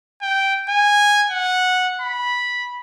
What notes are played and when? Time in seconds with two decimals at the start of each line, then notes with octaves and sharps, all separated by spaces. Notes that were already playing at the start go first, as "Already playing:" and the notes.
0.22 G5
0.69 G#5
1.30 F#5
2.01 B5